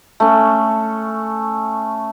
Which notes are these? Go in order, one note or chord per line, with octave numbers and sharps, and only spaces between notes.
A3 C#4